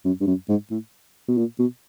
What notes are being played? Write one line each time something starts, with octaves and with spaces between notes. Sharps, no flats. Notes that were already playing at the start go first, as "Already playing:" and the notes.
F#2
G2
F#2
G#2
A2
B2
A#2
B2